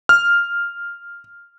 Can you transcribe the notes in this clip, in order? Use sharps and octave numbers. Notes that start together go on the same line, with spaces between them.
F6